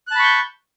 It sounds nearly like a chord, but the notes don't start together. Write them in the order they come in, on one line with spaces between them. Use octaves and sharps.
F#6 A5 B5 C#6 G6